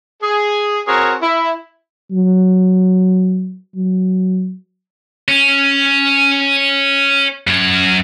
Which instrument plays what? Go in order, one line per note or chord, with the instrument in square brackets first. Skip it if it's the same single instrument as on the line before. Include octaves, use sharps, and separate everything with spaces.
[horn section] G#4
C4 F#4 G#4 A#4 C#5
E4
[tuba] F#3
F#3
[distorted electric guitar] C#4
F#2 C#5